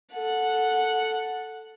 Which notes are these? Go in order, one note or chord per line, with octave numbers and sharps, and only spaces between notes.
A4 F#5